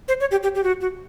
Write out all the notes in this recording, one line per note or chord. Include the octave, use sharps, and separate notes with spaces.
C5
C#5
G4
G4
G4
F#4
F#4